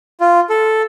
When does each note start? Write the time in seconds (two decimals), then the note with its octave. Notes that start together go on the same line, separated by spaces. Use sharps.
0.20 F4
0.50 A4